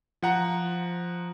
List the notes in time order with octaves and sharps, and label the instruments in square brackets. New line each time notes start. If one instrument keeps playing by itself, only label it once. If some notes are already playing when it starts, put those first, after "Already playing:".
[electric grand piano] F3 F#5 A#5